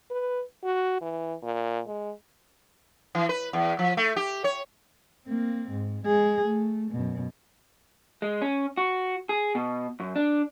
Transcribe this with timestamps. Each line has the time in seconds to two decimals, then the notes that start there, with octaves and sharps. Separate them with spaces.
0.11 B4
0.63 F#4
1.02 E3
1.43 A#2
1.87 G#3
3.15 E3
3.29 B4
3.53 E2
3.79 F3
3.97 A3
4.16 G4
4.44 C#5
5.27 A#3 C4
5.71 G#2
6.06 G#3 G#4
6.45 A3
6.91 F#2 B2
8.22 G#3
8.42 C#4
8.77 F#4
9.29 G#4
9.55 B2
10.00 F#2
10.16 D4